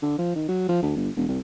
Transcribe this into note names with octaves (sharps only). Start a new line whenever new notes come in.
D3
F3
D#3
F#3
F3
D2
G1
E1
C2